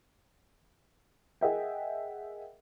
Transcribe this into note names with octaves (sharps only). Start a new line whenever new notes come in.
G#4 A#4 D#5 E5 F#5 G5